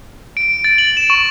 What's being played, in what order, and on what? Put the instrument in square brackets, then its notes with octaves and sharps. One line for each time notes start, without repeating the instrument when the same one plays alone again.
[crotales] D7
A6
F#7
E7
C#6